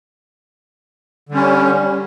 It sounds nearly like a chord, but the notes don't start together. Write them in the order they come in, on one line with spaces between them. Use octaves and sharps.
D3 G3 C#4